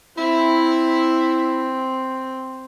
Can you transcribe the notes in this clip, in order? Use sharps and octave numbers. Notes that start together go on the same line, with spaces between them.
C4 E4